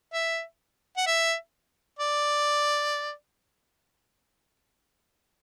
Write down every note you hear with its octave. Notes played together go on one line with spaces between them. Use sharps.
E5
F#5
E5
D5